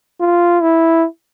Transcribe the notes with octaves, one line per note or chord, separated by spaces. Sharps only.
F4
E4